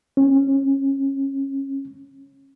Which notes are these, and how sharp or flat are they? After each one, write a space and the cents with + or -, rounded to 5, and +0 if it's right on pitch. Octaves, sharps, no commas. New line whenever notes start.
C#4 -25